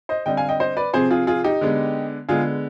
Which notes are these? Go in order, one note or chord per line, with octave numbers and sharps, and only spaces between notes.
C5 D#5
D3 G3 C4 D#5 G5
F5 G#5
D#5 G5
C5 D#5
B4 D5
C3 F3 C4 G#4 C5
F4 G#4
F4 G#4
D#4 G4
D3 G#3 B3
D3 G#3 B3 F4 G#4